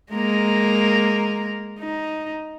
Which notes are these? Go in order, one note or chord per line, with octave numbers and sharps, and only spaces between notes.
G#3 A#3 A#4
D#4